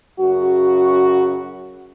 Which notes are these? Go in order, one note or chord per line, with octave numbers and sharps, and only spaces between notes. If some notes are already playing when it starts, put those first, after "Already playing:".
F#2 C#3 F#4